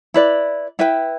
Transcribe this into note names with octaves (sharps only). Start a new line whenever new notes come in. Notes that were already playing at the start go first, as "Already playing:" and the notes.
E4 B4 D5
E4 B4 E5 G5